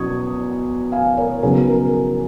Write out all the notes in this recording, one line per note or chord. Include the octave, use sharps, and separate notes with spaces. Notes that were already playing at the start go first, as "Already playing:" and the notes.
Already playing: B2 F#3 C#4 C#6 D#6 G#6
F5 G#5
A#4 C#5
C#3 F#3 B3 D#4 G#4 B4
A#4
A#4